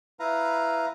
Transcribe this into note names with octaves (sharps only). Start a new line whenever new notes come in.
E4 B4 F5 A#5